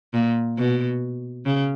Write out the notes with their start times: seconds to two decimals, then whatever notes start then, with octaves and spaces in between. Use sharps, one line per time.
0.14 A#2
0.57 B2
1.46 C#3